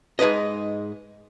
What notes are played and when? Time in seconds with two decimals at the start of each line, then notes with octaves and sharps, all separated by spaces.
0.19 G#2 G#3 D#4 B4 D#5